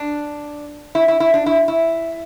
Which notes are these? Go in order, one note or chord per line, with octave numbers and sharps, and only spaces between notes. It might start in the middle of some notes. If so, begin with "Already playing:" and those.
Already playing: D4
E4
E4
E4
D4
E4
E4